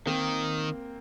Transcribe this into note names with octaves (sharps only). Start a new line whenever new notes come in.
D#3 A#3 C4